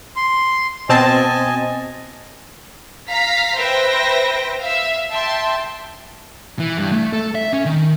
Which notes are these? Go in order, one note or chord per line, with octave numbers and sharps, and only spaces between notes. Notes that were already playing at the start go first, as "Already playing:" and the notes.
C6
B2 C4 D#5 G#5 A5
F5 A#5 B6
B4 C5 E5 G5 A#6
E5 F5
E5 G5 A5 C6
E3
G2
A3
A4
E5
C#4
D#3